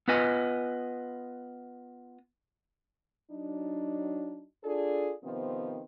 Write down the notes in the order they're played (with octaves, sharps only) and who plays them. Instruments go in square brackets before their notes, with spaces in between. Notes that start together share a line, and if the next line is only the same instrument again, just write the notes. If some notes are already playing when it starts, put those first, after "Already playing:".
[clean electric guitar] B3 F4 B4 D#5 G#5
[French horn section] F#3 D4 D#4
D4 F4 G#4 A4 D5
C3 D#3 F3 B3 C4